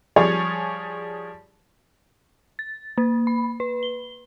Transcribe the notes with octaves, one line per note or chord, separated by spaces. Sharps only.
F3 G3 G#4 C#5 D5
A6
A#3
B5
B4
G7